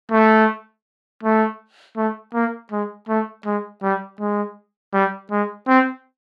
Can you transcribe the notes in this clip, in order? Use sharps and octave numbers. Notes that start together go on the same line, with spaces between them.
A3
A3
A3
A#3
G#3
A3
G#3
G3
G#3
G3
G#3
C4